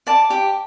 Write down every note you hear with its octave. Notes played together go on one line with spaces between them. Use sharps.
D5 A5
G4